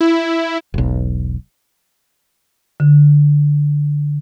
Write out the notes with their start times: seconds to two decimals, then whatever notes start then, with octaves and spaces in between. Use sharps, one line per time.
0.01 E4
0.74 E1 B1
2.80 D3